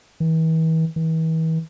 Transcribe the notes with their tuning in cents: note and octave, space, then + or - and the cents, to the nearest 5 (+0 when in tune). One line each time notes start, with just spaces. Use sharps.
E3 -40
E3 -40